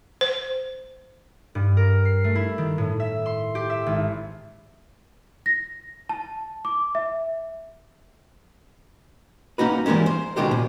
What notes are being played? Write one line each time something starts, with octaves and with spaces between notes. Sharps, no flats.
C5
G2
A#4
C7
A3
E4
D#3
A2
E5
C6
G4
E5
G#1
A#6
A5
D6
E5
A#3 C#4 D#4 F#4 B4
E3 G3 G#3 A#3 C#4
C5
C#2 B2 D#3 G#3 G4 C5
A#2